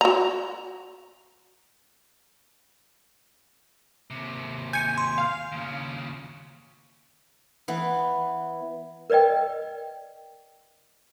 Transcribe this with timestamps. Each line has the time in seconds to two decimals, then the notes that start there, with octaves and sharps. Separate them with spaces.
0.01 F#4 A#5
4.10 D#2 C3
4.73 G#5 G6 C#7
4.98 C6
5.18 F5
5.52 D#2 C#3
7.68 E3 B3
9.10 A#4 B4 D5 D#5 G5